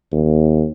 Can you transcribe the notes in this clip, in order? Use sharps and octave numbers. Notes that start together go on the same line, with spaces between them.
D#2